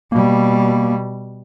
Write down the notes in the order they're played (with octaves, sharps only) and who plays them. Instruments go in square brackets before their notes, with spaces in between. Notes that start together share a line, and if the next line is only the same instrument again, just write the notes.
[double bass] B2 G3 [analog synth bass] A#3